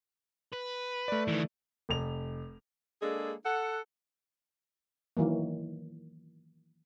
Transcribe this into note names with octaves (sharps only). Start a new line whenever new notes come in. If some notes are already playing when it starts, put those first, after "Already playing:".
B4
A3 D5
D#3 E3
F1 F7
G#3 A#3 D4 G#4 A4
A4 F#5
D#3 E3 F#3 A#3